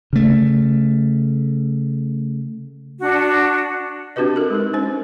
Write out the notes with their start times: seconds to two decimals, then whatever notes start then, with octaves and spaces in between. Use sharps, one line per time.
0.13 C#3 A3
3.02 D4 F#4
4.16 C4 D4 F#4 G4 B4 D#5
4.36 A4 A#4
4.50 G#3 D#4 A#4
4.73 G#3 C#4 C5